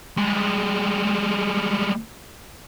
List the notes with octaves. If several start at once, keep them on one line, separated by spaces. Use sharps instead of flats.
G3 G#3